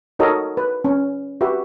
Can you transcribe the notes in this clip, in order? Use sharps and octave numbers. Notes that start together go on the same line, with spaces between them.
D#4 F#4 A4 A#4 C#5 D#5
B4
C#4
F#4 G4 B4 E5